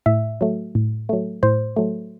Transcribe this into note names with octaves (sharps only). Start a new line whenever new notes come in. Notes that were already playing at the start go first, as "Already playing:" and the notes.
A2 E5
F#3 A3
A2
F#3 A3
A2 C5
F#3 A3